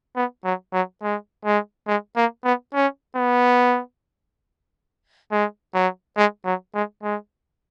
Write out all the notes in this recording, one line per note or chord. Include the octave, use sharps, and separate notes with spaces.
B3
F#3
F#3
G#3
G#3
G#3
A#3
B3
C#4
B3
G#3
F#3
G#3
F#3
G#3
G#3